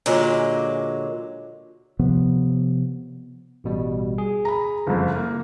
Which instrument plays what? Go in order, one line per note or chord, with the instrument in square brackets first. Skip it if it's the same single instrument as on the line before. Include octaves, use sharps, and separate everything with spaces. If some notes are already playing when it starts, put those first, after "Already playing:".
[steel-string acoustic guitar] A#2 D3 F#3 G#3
[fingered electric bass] C3 F3 B3
[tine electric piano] A1 B2 G3
G#4
[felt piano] A#5 B5
F#1 F2
A#3